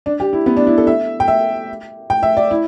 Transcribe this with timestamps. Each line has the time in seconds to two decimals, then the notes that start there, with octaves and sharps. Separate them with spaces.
0.06 D4
0.20 G4
0.33 E4
0.46 B3
0.57 D4
0.67 E4
0.78 A4
0.87 E5
1.20 G5
1.28 E5
2.10 G5
2.23 E5
2.37 D5
2.51 E4